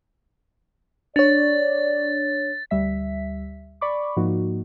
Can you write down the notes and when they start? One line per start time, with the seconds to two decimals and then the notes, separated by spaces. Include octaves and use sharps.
1.16 D4 C#5 D5 A6
2.71 D2 G3 E5 B6
3.81 D5 B5 C#6 D6
4.16 G#2 F3 A#3 D#4 F#4